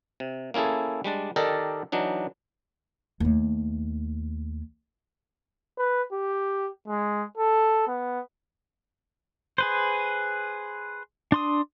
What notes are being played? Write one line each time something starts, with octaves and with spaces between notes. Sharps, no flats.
C3
A#3 C#4 E4 G#4 A4
G3 G#3 D4 D5
D#3 G4 A4 A#4 D5 D#5
E3 F#3 D4 D#4
D#2 A3
B4
G4
G#3
A4
B3
G#4 B4 C5
D4 C6 D#6